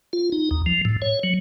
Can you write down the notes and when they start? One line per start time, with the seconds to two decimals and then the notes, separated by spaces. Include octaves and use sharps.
0.13 F4
0.32 D#4
0.51 D#2
0.66 F3
0.85 A2
1.02 C#5
1.23 F#3